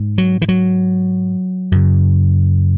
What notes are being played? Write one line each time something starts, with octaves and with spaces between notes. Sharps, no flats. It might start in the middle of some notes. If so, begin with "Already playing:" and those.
Already playing: G#2
F#3
E3
F#3
F#2 C#3